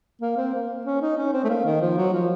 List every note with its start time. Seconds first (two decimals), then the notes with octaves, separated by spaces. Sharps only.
0.22 A#3
0.37 C4
0.54 A#3
0.85 C#4
1.02 D#4
1.18 C#4
1.33 C4
1.44 A3
1.49 A#3
1.66 D#3
1.81 F3
1.98 F#3
2.13 F3